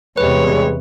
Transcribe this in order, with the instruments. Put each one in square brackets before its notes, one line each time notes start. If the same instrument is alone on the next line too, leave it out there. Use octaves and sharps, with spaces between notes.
[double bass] E2 C3 [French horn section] G2 G3 G#3 [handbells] B4 [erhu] C#5